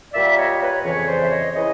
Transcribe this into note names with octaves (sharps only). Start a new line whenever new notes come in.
A#2 G3 A#3 D5 E5
E5
C#5 D#5
B4 C#5
F2 C#3 E3 B4 C#5
C5 D5
E5
C#5 D#5
C#3 E3 C#5 D#5